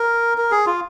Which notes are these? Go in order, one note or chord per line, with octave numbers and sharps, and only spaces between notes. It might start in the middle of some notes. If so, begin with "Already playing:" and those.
Already playing: A#4
A#4
G#4
F4